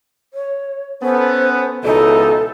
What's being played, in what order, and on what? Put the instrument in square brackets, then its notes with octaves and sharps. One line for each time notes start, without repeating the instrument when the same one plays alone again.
[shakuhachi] C#5
[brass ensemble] B3 C#4 A4 [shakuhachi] C5
[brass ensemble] C#2 B2 E3 [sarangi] D#4 [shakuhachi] A4